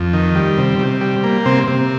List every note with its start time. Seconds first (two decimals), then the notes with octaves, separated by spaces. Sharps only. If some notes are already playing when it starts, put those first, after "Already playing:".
Already playing: F2
0.14 D#3
0.35 G3
0.58 C3
0.79 C3
1.01 G3
1.24 A#3
1.46 C3 C4
1.68 C3